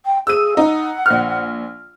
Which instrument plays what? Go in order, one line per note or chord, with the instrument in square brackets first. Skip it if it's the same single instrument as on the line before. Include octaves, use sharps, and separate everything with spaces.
[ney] G5
[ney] G#4 [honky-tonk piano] E6 D#7
[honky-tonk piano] D#4 [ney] F#5
[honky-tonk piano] A#1 F6